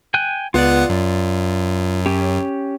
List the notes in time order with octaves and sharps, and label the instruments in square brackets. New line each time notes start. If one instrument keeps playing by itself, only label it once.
[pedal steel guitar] G5 G#5 F#6
[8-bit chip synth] C#2 B3 F#5 [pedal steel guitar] F4 D5
[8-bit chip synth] F#2
[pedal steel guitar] C#4 G4